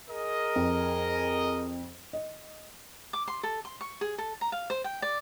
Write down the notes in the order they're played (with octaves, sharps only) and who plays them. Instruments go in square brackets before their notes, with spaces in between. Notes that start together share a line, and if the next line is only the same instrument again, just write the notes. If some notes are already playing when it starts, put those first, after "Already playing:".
[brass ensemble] G#4 A#4 D#5
[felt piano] F2
D#5
[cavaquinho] D6
C6
A4
C6
C#6
G#4
A4
A#5
F5
C5
G5
D5